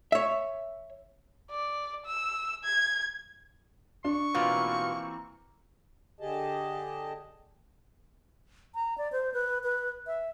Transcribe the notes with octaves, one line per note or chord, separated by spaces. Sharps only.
C#5 E5
D5
E6
G#6
D4 C#6
B2 E3 A#3 C4 F4
D3 G4 G#4 D#5 A5
A#5
D5
C5
B4
B4
E5